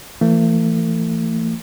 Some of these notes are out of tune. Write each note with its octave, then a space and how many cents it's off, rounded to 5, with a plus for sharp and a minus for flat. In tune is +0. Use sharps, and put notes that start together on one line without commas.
E3 +30 A3 +40